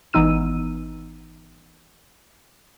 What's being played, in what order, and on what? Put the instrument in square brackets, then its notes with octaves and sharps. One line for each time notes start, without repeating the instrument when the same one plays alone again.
[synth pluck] G#1 E3 B3 D#4 E6 D#7